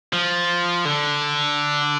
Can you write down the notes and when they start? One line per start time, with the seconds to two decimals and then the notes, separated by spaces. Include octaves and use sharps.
0.13 F3
0.85 D3